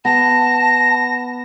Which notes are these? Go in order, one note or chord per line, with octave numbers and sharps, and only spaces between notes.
B3 A5 A#6